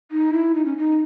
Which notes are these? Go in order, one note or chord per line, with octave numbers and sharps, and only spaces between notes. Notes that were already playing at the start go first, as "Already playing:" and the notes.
D#4
E4
D#4
C#4
D#4